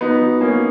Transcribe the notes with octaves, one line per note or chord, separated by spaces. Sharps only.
F#3 B3 D#4
F#3
F#3 A#3 C#4